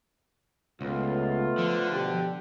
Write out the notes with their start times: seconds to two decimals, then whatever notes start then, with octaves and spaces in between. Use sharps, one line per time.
0.81 C#2 A3 B3 F4
1.58 D3 F3
1.91 B2 D4 G4